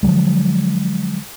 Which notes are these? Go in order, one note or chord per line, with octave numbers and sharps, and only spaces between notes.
D3 F3 F#3 G#3